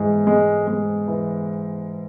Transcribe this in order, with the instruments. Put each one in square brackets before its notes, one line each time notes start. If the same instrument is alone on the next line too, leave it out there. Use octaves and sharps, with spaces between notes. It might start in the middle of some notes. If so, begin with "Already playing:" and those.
Already playing: [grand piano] G#2 E3 G#3
G#3
G#3
E3